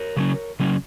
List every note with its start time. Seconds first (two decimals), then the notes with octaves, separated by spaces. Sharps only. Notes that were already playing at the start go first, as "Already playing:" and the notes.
Already playing: A#4 C#5
0.17 C#3 F#3 C#4
0.59 C#3 F#3 C#4